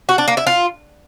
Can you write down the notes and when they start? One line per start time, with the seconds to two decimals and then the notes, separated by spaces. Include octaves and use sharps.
0.09 F#4
0.18 D4
0.28 A#3
0.37 E4
0.47 F4